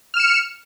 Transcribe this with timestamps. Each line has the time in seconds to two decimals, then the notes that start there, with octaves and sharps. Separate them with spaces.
0.14 F6
0.17 E7
0.20 C#7